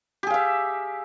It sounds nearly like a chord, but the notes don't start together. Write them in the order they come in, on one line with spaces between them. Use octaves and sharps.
G4 G#4 F5 E5